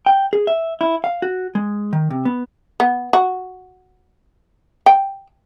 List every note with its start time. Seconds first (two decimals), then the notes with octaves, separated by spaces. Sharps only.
0.06 G5
0.33 G#4
0.47 E5
0.81 E4
1.04 F5
1.22 F#4
1.55 G#3
1.93 D#3
2.10 C3
2.25 B3
2.80 B3
3.13 F#4
4.86 G5